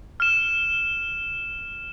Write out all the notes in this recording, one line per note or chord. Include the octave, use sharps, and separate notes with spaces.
F6 E7